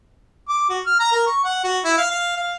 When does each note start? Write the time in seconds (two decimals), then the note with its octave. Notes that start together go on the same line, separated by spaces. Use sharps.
0.48 D6
0.69 F#4
0.86 F6
1.00 A#5
1.12 A#4
1.26 C#6
1.44 F#5
1.64 F#4
1.84 E4
1.98 F5
2.10 F5
2.37 F5